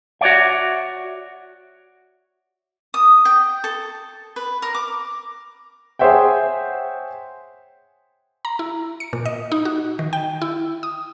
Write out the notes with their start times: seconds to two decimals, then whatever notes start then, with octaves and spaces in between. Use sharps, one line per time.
0.21 F#4 C#5 D5 E5
2.94 D#6
3.25 G5
3.64 A4
4.36 B4
4.62 A#4
4.75 D6
5.99 G#4 C5 C#5 E5 F#5 G5
8.45 A#5
8.59 E4
9.00 C#7
9.13 A#2
9.25 D#5
9.52 D#4
9.65 F#4
9.99 D#3
10.13 G5
10.42 E4
10.83 D#6